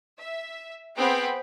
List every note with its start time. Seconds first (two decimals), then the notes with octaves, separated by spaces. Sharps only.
0.18 E5
0.95 B3 C4 G#4 G5 B5